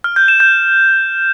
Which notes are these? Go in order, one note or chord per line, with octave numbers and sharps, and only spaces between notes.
F6
G6
E7
G6